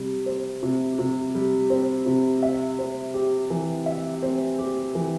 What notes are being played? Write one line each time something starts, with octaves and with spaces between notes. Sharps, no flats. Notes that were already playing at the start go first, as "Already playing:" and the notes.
Already playing: C3 G3
C4
C3
C3
G3
C4
C3
E5
C4
G4
E3
E5
C4
G4
E3